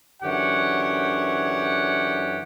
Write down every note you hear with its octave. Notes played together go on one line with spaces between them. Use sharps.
F#2 D3 E3 G4 C#5 F#5